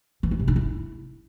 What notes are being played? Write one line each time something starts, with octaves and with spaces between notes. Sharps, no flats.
E3
E4
C3
D#4
E4